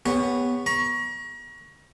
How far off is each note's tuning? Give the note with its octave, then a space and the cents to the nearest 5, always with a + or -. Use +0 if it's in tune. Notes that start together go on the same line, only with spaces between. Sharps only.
B3 +0 G4 +40 C#5 +0
A#5 +35 C#6 +0